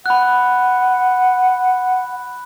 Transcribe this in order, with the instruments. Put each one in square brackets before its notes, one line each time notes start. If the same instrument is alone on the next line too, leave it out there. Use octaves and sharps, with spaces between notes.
[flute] F#5 [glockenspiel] B5 F#6